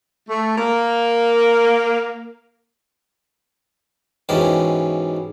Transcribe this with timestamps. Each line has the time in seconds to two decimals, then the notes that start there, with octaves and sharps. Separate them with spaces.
0.29 A3
0.58 A#3
4.29 G#2 B2 E3 C#4 G4 G#4